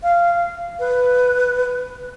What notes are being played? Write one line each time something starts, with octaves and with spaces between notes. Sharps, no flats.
F5
B4